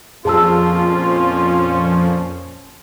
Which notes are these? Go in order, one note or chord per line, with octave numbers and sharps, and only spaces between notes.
F2 A#2 F3 C#4 F4 G#4 A5 E6